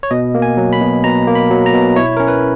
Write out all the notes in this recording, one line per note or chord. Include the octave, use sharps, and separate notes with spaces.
C#5
B2 D#5
A#3
G#5
F#3
B5
B2
B2 A#5
A#3
B5
F#3
A#5
B2
E4 C#5
C#4 A#4
B4